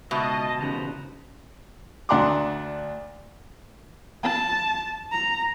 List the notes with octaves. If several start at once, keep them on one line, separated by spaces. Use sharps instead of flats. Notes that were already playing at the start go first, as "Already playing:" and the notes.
C#2 B2 D#5 E5 A5
B1 E2 C#3 B4 C5 A#5
D2 D4 F#5 A#5 C6 D6
A5
A#5